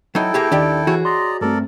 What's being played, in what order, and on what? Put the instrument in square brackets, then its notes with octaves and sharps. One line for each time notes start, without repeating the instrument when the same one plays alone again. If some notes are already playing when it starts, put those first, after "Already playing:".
[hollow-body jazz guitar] F#3 D#4 [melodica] E4 A4 G5
[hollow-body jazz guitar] A#3 G4 G#4
[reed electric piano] D#2 D#3 [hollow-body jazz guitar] D4 G4
[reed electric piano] E3 [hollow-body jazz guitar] F#4 G#4 C#5
[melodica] D5 D#5 A#5 [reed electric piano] C6
[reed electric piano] G2 A3 C4 [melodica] A4 A#4 D5